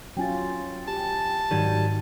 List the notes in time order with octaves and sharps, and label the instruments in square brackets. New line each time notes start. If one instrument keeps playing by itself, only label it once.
[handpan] F#3 C#4 F4 [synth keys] G5 G#5 A6
[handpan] G4 [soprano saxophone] A5
[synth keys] G#2 G#6 D#7 [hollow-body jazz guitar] D#3 F#3 G3